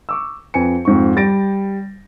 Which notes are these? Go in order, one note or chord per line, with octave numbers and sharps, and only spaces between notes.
C#6 D6 E6
F2 B4 G#5 C#7
F2 G#2 C#6
G3 A6 A#6 D7